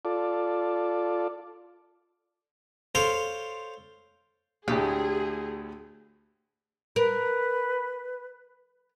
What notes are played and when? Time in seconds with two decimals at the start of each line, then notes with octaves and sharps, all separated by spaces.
0.05 F4 A4 D5
2.95 A4 C5 C#5 F5 C6 D6
4.68 D2 A2 G4 G#4
6.96 A#4 B4